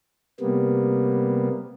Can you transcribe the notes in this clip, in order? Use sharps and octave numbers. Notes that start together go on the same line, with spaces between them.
C3 G3 A#3 B3